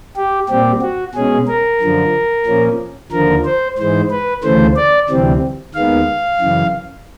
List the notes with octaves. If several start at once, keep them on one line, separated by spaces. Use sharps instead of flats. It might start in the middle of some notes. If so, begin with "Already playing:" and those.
G4
A#2 G3 C4 G4
F#4
B2 G#3 C#4 G#4
A#4
F#2 D3 F3
A#2 F3 A#3 C#4
D#2 D3 F3 A#4
C5
G#2 E3 G#3 C5
B4
D2 C#3 E3 A3 C5
D5
D2 C3 E3 G3 C4
D#2 D#3 G#3 B3 F5
F#2 C#3 E3